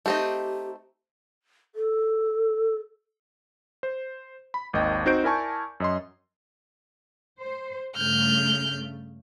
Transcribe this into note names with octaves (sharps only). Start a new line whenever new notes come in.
A3 C4 D#4 G4
A4
C5
B5
G#1 D#2 D#5 G5
C4 D#4 F#4 C5 G6 D7
E4 A#4 D5 G#5 A5 C#6
F#2 D#5 C6
C5
G2 C#3 A3 F6 G6